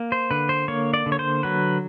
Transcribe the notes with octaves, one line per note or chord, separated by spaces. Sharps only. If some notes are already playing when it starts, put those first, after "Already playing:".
Already playing: A#3
C5
D3 B4
C5
A#3 C#5
D5
D3
C#5
C5
F#3 B4